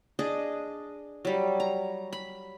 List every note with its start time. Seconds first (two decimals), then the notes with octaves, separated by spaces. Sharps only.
0.19 D4 G#4 D#5
1.25 F#3 G3
1.60 A#5
2.13 B5